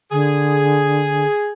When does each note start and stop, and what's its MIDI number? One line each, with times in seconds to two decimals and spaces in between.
0.12 1.26 50
0.12 1.53 68